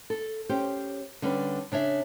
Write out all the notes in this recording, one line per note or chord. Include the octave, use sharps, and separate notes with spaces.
A4
C#4 G4 C5
D3 G3 C#4 A4 B4
C#3 D4 C#5 E5